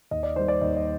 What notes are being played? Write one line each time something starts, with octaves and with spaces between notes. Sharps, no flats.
D#2 D#5
D5
D#3 G3 C5
D5
D#2 D#5
D#5